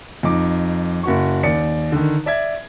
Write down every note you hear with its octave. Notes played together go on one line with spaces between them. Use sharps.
F2 D#4 D6
F#1 F#4 C#6
D#2 D5 C#7
D3 D#3
D5 E5 G#6